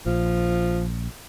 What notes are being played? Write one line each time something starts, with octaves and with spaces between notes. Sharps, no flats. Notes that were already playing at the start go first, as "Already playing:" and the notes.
A#1 F3